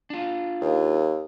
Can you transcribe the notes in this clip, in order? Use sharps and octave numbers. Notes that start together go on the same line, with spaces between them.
D4 F4
D#2